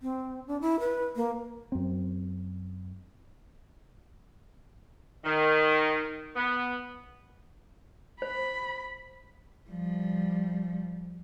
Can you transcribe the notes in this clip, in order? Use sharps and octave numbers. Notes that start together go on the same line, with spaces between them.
C4
D4
E4
B4
A#3
F#2 C4
D#3
B3
C5 B5
F3 G3